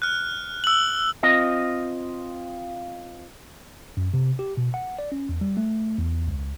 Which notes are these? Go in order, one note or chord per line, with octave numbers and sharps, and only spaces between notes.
F6 F#6
E6 F#7
C4 F4 D#5
F#2
C3
G4
B2
F#5
D5
C#4
E2
G3
A3
E2
C#2